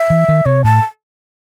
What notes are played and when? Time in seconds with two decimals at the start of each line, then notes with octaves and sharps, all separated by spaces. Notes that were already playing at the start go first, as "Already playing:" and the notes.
Already playing: E5
0.10 E3
0.29 D#3
0.46 C3 C#5
0.64 A2 A5